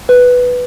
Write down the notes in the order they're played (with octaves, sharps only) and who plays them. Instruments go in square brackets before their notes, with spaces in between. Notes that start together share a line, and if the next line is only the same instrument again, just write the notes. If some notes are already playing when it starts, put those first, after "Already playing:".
[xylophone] B4